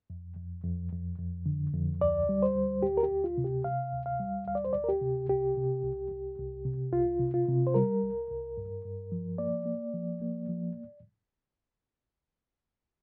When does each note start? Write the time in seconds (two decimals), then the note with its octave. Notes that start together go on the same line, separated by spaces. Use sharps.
0.10 F2
0.37 F2
0.64 F2
0.92 F2
1.18 F2
1.46 D3
1.74 F2
2.00 D2 D5
2.29 G3
2.43 C5
2.55 D2
2.83 D2 G4
2.97 A#4
3.03 G4
3.11 D2
3.24 F4
3.38 C3
3.44 G4
3.64 C3 F5
3.93 D2
4.06 F5
4.20 G3
4.47 D2 F5
4.55 D5
4.64 C5
4.73 D2 D5
4.84 A#4
4.89 G4
5.01 C3
5.28 C2 G4
5.57 C3
5.84 C2
6.11 C2
6.38 C2
6.65 C3
6.93 C2 F4
7.20 C3
7.34 F4
7.48 C3
7.67 C5
7.74 G3 A#4
8.02 C2
8.30 C2
8.57 G2
8.85 G2
9.12 F3
9.38 A#3 D5
9.66 A#3
9.94 F3
10.22 A#3
10.49 F3